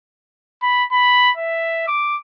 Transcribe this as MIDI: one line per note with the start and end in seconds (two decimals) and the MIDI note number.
0.62 0.84 83
0.92 1.31 83
1.37 1.86 76
1.88 2.18 86